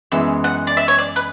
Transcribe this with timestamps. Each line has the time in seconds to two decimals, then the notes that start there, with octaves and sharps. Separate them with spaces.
0.12 F#2 E3 G#3 B3 E5
0.44 F#5
0.67 D5
0.77 E5
0.88 C#5
0.98 D5
1.16 B4